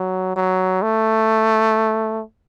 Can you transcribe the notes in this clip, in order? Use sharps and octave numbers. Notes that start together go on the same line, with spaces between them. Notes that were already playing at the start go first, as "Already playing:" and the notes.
Already playing: F#3
F#3
A3